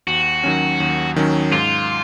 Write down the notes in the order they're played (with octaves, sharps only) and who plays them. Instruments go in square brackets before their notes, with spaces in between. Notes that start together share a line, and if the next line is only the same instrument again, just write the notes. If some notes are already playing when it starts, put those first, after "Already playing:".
[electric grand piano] D#2 [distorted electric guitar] F#4
[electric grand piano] D#3 F#3 C#4
D#2
D#3 F#3 C#4
[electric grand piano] G#2 [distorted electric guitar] F4